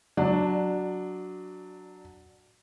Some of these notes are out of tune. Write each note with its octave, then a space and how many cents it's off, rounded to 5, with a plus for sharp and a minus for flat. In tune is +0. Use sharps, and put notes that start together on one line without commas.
F#3 +0 D4 +0 D5 +20